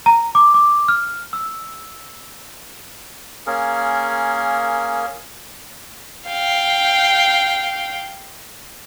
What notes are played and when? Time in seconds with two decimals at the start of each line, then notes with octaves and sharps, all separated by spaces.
0.06 A#5
0.35 D6
0.54 D6
0.88 F6
1.33 E6
3.47 A#3 C#4 G#4 A#4
6.28 F5 G5